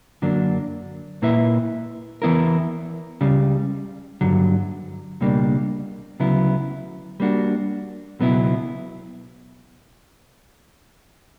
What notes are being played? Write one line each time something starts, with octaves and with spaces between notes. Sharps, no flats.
F#2 D3 F#3 A#3 D4
A#2 A#3 E4 B4 E5
E3 B3 E4 A#4
C#2 C#3 G3
G2 D3 F#3
C#2 B2 G3 A#3 D4
D2 C#3 F#3 B3 E4
G3 A#3 D4 F#4
C#2 B2 F#3 B3 E4